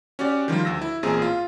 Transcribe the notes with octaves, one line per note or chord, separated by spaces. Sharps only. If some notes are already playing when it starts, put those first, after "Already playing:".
C#4 F#4 G4 D5
D#3 F3 G3 F4
D2 E6 A#6
E4
A1 A#2 C4 G#4 A#5
F4